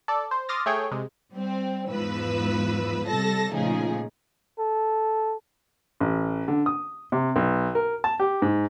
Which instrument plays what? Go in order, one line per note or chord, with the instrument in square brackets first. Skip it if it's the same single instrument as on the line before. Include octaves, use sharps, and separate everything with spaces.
[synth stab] A4 D5
C5
C6 D6 D#6 F6 A6 A#6
A3 G#4 C#5 G5
C3 G#3
[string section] G3 C4
E2 G#2 F3 B4 E6
C3 G3 A4 A5 A#6
A#2 C#3 F3 A3 D#4 G#4
[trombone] A4
[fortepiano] A1
D3
D#6
C3
B1
A#4
A5
G4
G#2